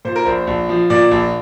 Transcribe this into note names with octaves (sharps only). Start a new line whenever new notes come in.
A#2 C5
A#4
A#1 C5
A#1
F3
A#2 D5
A#1